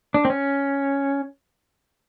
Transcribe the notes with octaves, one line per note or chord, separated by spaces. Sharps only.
D4
C4
C#4